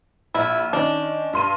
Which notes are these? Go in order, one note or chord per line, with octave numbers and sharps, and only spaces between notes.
A#1 E4
D#3 C#4 D4
G2 C6 D#7